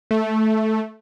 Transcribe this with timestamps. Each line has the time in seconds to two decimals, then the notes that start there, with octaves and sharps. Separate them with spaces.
0.11 A3